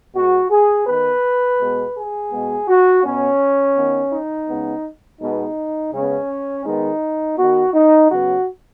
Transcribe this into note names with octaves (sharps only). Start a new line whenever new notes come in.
B2 G#3 B3 F#4
G#4
D#3 B3 B4
B2 G#3 B3
G#4
B2 G#3 B3
F#4
B2 B3 C#4
D#3 B3
D#4
C#3 G#3 B3
B2 G#3 B3 D#4
C#3 G#3 B3 C#4
D#3 G#3 B3 D#4
D#3 B3 F#4
D#4
C#3 F#3 B3 F#4